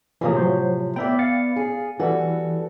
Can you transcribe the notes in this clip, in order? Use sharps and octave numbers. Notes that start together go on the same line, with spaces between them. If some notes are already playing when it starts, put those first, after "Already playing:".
A2 C3 E3 F3 A#3 G#4
F#3 C5
B3 D5 E5 G5
F5 A6 C#7
G#4
E3 G3 F#4 A4